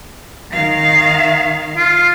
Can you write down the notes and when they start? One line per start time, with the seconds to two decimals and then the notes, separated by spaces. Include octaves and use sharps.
0.52 D#3 F5
1.77 F4